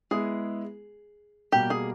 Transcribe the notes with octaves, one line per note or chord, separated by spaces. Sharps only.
G#3 B3 E4 G#4
B2 G3 A#3 G4
G#4